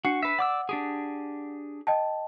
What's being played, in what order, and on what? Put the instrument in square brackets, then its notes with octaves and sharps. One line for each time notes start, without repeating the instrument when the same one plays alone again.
[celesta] D4 C7 C#7 [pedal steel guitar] F#4
[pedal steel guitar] B4 E5
[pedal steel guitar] D5 D6 E6 [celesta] F#5
[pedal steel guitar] D4 G4 G#4
[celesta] D#5 G5 A5